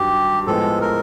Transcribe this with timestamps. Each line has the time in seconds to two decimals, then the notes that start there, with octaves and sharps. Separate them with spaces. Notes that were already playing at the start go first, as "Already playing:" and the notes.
Already playing: G2 D#3 F#3 G4
0.46 A2 F3 G#3 B3 A4
0.81 A#4